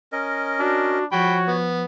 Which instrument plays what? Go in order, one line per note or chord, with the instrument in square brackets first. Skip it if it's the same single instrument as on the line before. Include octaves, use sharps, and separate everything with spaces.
[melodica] C#4 A#4 D#5
[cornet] D4 [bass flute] F#4
[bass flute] F3 [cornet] F#4 [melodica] C#5 [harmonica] G5 B5
[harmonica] B3